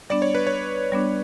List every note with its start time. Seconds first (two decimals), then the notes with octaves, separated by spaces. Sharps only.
0.10 G3 B3 D4 D5
0.22 C#5
0.35 B4
0.47 C#5
0.92 G3 B3 D4